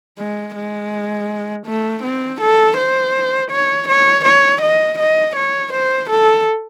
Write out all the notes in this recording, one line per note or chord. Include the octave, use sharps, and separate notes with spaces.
G#3
G#3
A3
C4
A4
C5
C#5
C#5
C#5
D#5
D#5
C#5
C5
A4